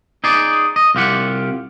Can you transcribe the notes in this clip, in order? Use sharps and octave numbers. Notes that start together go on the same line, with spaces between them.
D#4 G#4 D5
D#5
C2 F4 G4 F#5